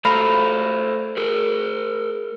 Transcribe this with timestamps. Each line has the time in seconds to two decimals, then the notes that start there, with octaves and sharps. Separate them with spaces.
0.05 A3 A4 C5 D5 F5 A#5 B5
1.17 G#4 A#4